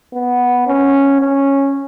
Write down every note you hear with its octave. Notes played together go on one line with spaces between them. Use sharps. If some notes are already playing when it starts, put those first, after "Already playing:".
B3
C#4
C#4